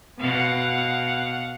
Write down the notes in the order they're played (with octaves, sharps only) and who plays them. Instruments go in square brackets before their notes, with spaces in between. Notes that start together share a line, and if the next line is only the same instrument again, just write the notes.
[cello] B2 [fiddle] F5 F#5